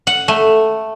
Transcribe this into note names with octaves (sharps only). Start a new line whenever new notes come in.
F#5
A3